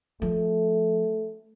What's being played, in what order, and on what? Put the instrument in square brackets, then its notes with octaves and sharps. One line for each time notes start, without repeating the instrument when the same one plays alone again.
[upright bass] F3 [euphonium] A3